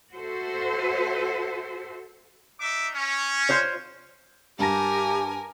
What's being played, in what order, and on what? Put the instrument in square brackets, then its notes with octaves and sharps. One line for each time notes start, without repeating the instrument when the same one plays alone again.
[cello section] F#4 A4 C5 E5
[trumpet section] D#4 E5 D6
C#4
[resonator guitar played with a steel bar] F4 C5 C#5
[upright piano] G2 A5 A#6 [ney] G4 [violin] A#4 G#5